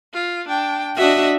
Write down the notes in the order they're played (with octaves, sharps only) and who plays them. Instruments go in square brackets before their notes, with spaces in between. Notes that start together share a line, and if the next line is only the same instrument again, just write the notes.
[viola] F4
D4 G5
[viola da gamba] D4 F#4 [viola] D#5 E5